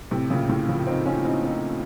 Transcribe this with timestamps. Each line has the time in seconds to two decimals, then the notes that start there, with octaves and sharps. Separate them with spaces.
0.11 A2 C3
0.30 A#2 C#3
0.49 A2 C3
0.68 C#3 F3
0.87 C4 D#4
1.06 C#4 F4
1.25 C4 D#4
1.44 C4 D#4